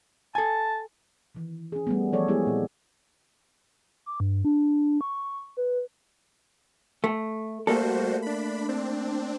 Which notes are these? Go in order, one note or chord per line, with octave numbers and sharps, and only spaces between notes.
A4 G#5 A5
D#3 E3
C#4 G#4
G3 A3 B3
E3 F3 A4 C#5 D5
G#3 B3 E4 G4 G#4
A#2 C4
D6
G2
D4
C#6
B4
A3
G3 A3 A#3 F#4 A4 C5
D4 B5
C4 D4